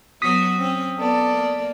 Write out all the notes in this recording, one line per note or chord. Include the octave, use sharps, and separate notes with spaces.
F#3 B3 F#4 D#6 B6
C4 C#4
B3 A4 D5
A#3